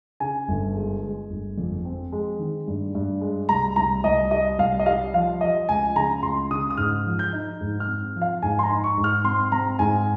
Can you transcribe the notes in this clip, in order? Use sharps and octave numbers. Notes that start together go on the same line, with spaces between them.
C#3 G#5
G1
G#3
G#3
G1
F2
C4
G#3
D#3
G2
G2
G#3
C2 A#5
C2 A#5
C2 D#5
G3 D#5
C2 F5
D#5
G3 F5
F3 F5
F3 D#5
C#2 G#5
C#3 A#5
C#2 C6
C#3 D#6
D#6
G#2 F6
F3
G6
D#4
G#2
F6
C4
F3
F5
G#2 G#5
C6
A#5
D#4
C#6
G#2
F6
C4 C6
C4 A#5
G#2 G#5